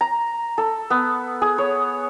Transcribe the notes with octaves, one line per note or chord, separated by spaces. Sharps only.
A#5
A4
B3
G#4
C#5